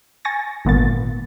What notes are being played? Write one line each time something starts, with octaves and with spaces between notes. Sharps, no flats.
G#5 C#6 A6 A#6
G#1 A#2 B3 A6